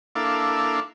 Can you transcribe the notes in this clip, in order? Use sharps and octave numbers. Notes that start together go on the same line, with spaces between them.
A#3 D4 E4 A4 F5